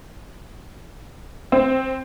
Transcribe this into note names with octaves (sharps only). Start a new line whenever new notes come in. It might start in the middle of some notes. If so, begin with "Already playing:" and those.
C4